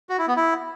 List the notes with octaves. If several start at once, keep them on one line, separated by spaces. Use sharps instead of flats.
F#4
E4
B3
E4